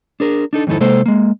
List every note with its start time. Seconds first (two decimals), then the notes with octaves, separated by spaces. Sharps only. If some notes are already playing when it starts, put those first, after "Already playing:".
0.20 D4 G#4 A#4
0.53 D4 D#4 A4
0.67 F2 G#2 D#3 D#4 E4 A4
0.80 C3 G#3 A#3 A4 C5
1.06 G#3 A#3